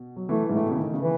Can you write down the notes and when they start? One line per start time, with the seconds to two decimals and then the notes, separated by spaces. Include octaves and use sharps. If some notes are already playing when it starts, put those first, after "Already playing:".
Already playing: B2
0.16 F#3
0.28 E3 A3
0.49 G#2
0.53 A2 A3
0.63 B2
0.70 C#3
0.77 D#3
0.94 C#3
1.01 E3